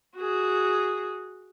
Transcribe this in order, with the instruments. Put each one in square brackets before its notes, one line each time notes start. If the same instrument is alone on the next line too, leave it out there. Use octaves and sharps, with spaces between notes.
[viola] F#4 G#4